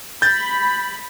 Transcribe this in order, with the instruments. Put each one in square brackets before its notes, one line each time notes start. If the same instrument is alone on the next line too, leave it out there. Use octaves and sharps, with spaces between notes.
[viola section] B5 [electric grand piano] G6 A6